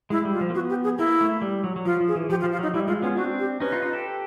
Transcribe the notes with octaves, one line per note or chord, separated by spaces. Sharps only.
G#3 E4
G3
F4
F3
A#3
B3 F#4
G4
G#4
A#3 E4
A3
G3
F#3
F#3
F3 F4
F3
G#4
E3
F3 G4
F4
F3
F4
F#3 D#4
G3 E4
G#3 F4
B3 C#4 F4
C4 D4 F#4
G4
C#4 D#4 B4
D#4 F4
D#4 F4
G4 A4